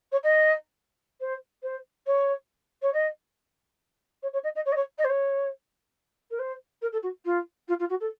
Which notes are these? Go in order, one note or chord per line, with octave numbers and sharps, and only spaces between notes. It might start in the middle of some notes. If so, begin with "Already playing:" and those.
C#5
D#5
C5
C5
C#5
C#5
D#5
C#5
C#5
D#5
D#5
C#5
D#5
C#5
D#5
C5
C#5
A#4
C5
A#4
A4
F#4
F4
F4
F4
F#4
A4